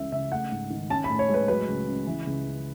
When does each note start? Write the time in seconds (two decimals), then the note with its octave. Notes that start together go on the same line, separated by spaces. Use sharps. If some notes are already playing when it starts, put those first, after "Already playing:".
Already playing: C#2 C#3 E3 E5
0.12 C#3 E5
0.31 A3 F#5
0.52 G#2
0.70 D#3
0.90 C#4 A5
1.04 B5
1.10 A2
1.19 C#5
1.29 G#3
1.34 B4
1.48 F#3 B4
1.68 C#2
1.88 C#3
2.07 E3
2.27 C#2
2.46 C#3